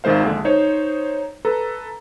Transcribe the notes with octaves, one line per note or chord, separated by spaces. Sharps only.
G#1 D#3 G#3 C5 F5
A#1 D3 G#3
D#4 C5 C#5
A4 B4 A#5